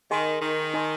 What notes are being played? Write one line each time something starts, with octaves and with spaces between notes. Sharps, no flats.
D#3 G#4 D#5 G#5 C6
D#3
D#4 A#4 D#5 G#5 C6